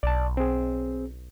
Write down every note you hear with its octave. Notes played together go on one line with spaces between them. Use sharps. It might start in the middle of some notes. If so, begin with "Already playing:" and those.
B1 D5 A5
C4 G#4